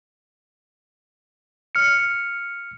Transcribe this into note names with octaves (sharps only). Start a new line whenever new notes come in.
F6 C#7